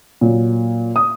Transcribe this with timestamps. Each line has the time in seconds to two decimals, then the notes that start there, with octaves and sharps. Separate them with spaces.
0.21 A#2 F#3
0.96 D#6